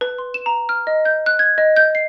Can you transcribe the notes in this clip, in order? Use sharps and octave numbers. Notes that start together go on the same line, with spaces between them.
B4
C6
E7
A#5
F6
D#5
G6
F#6
G#6
D#5
G6
C7